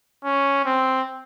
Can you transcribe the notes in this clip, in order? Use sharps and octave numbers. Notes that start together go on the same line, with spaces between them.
C#4
C4